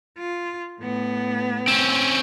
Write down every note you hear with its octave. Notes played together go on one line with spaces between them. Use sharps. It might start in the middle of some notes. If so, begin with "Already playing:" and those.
F4
A2 B3
C4 C#4